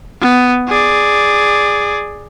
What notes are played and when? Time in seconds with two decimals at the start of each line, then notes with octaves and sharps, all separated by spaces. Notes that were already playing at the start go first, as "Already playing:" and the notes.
0.21 B3
0.68 G#4 D5